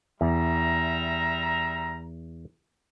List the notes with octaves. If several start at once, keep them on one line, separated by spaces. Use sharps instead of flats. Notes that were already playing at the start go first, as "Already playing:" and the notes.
E2 G3 E5 A#5